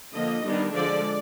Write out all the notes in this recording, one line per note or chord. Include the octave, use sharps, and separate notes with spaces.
D3 F3 A#3 D#5
D#3 G3 B3 D4
D3 F3 G#3 D5